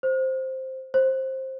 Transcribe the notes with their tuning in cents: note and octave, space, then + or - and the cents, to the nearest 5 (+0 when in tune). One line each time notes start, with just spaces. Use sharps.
C5 +5
C5 +15